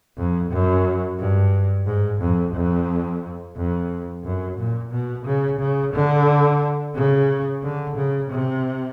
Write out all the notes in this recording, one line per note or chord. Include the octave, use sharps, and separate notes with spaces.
F2
F#2
G2
G#2
F2
F2
F2
F#2
A#2
B2
C#3
C#3
D3
C#3
D3
C#3
C3